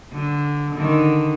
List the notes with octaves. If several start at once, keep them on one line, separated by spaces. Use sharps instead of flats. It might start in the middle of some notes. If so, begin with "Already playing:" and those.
D3
D3 D#3